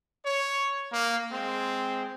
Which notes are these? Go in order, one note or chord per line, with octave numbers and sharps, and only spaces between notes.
C#5
A#3
G#3 C4